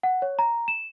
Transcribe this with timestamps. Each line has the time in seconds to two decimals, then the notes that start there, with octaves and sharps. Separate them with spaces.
0.03 F#5
0.22 C#5
0.39 A#5
0.68 E7